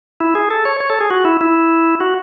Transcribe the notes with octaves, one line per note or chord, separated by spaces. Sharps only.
E4
G#4
A4
C#5
C#5
A4
G#4
F#4
E4
E4
F#4